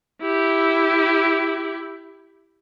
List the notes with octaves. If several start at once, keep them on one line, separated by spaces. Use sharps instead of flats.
E4 G4